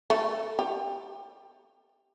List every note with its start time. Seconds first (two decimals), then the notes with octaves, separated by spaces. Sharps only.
0.10 A3
0.59 G4